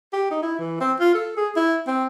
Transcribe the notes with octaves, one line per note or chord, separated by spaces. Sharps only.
G4
D#4
E4
E3
C4
F4
A4
G#4
E4
C4